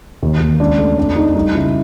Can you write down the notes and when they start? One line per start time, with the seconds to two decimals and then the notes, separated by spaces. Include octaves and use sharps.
0.23 D#2
0.40 D#2
0.60 C#2 D4
0.79 A3
0.97 F2 D4
1.16 A3 D#4
1.35 G3 D#4
1.54 C#3 E4